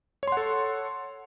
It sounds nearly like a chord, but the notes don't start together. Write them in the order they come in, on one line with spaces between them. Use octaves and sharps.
C#5 C6 F#5 A4